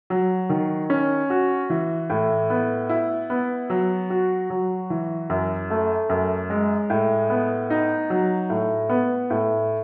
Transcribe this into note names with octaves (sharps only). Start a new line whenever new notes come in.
F#3
D#3
C#4
F#4
E3
A2
B3
E4
B3
F#3
F#4
F#3
E3
F#2
A3
F#2
G#3
A2
B3
D#4
F#3
A2
B3
A2